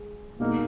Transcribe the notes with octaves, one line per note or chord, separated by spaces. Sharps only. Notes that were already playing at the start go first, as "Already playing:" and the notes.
Already playing: G#3
B2 G#3 A#3 D#4 A#4